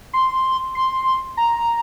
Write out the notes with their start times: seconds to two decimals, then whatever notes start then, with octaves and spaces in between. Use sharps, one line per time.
0.13 C6
0.75 C6
1.37 A#5